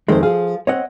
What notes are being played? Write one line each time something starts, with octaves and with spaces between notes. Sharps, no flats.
F2 D#3 G#3 A3 C5
F3 G#4 F5
C4 C#5 D#5 F#5